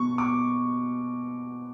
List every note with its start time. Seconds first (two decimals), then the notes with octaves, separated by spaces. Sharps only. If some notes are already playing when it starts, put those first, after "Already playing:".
Already playing: B2 C#6
0.18 D6